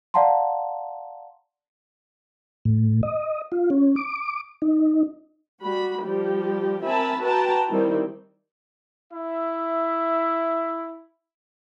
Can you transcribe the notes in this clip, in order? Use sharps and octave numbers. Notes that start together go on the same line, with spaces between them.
D5 F5 F#5 A5 A#5 C6
A2
D#5
F4
C#4
D6
D#4
G3 F#4 B5
F3 G3 G4
C4 A#4 E5 G#5 A5 B5
F#4 B4 G5 A5 A#5
D#3 G3 C4 E4
E4 E5